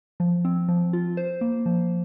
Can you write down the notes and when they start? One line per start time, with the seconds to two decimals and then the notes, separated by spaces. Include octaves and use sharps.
0.20 F3
0.45 C4
0.68 F3
0.93 F4
1.17 C5
1.41 A#3
1.66 F3